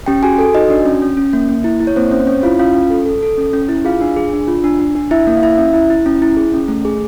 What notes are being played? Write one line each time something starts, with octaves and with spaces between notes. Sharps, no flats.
C#4 G4 G5
F#4 G#4 G#5
A4
D#4 F#4 D#5
D4 F#4 D5
C#4
C#4
C#4
A#3
A#3
E4
E4
C#5
A#3 C4 C5
C4 C#4 C5
C#4 C#5
E4 F4 F5
C#4 F4 F5
C#4
A4
A4
A4
C#4
C#4
E4
F4 G#4 F5
D4
G#4
D4
F4
D4
D4
D4
E4 E5
A#3
F5
E4 E5
C#4
E4
E4
C#4
E4
G#4
C#4
A3
G#4